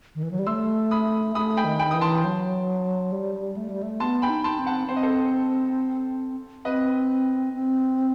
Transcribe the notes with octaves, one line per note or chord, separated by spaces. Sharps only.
D#3
E3
F#3
G3
A3 C6 E6
B5 D#6
A3 B5 D#6
G5 B5
D#3
G5 B5
E3 D#6
A5 C6
F#3
G3
A3
G3
A3
B3 A5 C6
G5 B5
D#4
A5 C6
C4
F#5 A5
C4 C5
D#5
A4 C5
C4 B4 D#5
C4